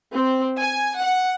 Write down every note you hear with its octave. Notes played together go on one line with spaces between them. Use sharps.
C4
G#5
F#5